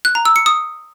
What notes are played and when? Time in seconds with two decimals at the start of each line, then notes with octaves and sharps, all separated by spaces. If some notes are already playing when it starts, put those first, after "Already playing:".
0.05 F#6
0.15 A#5
0.25 E6
0.36 C#7
0.46 D#6